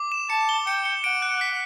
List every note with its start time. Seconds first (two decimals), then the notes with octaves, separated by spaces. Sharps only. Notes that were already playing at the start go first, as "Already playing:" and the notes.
Already playing: D6
0.12 E7
0.30 A5 C#7
0.49 G7
0.67 G5 C#7
0.85 C#7
1.04 F#5 D7
1.22 F#6
1.41 B6